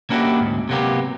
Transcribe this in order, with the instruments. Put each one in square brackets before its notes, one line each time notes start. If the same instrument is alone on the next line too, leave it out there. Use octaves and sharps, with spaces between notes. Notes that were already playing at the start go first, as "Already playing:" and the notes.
[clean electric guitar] A#3 C#4 D4 E4 F#4 G4
D2 G#2
C3 F#3 A#3 B3 G4